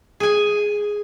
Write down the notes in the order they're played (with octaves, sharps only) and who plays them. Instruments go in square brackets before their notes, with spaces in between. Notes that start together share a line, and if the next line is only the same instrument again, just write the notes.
[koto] G#4 G#5